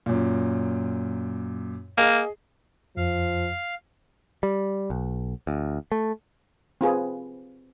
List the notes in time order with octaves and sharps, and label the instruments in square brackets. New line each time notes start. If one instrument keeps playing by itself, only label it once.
[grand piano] F#2 A#2
[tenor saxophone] A#3 [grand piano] G#4 D#5
[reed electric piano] F2 [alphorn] F3 [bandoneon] F5
[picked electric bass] G3
B1
D2
A3
[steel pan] C4 F4 G#4 B4